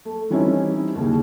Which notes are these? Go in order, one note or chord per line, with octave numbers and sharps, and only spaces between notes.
A3
E3 G3 C4 C#4 D#4 E4
D#2 C#3